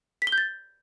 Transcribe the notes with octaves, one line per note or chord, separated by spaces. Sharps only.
B6
G7
G6
A6